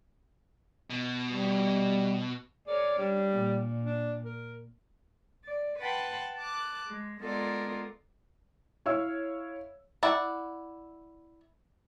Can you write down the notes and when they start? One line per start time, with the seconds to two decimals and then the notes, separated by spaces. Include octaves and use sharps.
0.90 B2
1.29 G3
2.67 G#4 A#4 C#5 D5
2.99 G3 D4
3.32 A#2
3.83 D4
4.24 A#4
5.43 D5
5.79 B4 F#5 G5 A5 B5 C6
6.36 A5 D6 F#6
6.86 G#3
7.20 G#3 B3 F4 A4 A#4 D5
8.86 E4 C#5 F5 E6
10.03 E4 D5 F#5